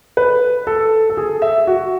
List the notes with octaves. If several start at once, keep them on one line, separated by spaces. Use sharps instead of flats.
B4
A4
A4
G#4
E5
F#4